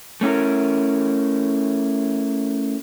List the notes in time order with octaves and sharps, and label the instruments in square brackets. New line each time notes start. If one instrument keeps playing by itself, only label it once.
[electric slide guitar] A3 C#4 E4 A#4